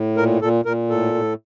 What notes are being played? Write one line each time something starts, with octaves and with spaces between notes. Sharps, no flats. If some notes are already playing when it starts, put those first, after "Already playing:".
Already playing: A2
A#2 A#4
A#2 A4
A#2 A#4
A2 A4
A2